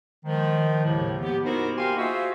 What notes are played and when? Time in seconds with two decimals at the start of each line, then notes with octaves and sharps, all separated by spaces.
0.24 D#3 F3 G#3
0.85 D#2 A2 C#3 F3 A#3
1.22 B3 G4
1.45 B3 D#4 E4 F#4 A#4 C5
1.77 A#3 G4 F5 G#5 C6
1.96 F4 F#4 G#4 C5 D#5 E5